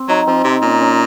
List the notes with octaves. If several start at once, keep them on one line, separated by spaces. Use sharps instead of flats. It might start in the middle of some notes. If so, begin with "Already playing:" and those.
Already playing: C4
F#3 D#4
F3 C4
C3 D#4
A#2 C#4
C#4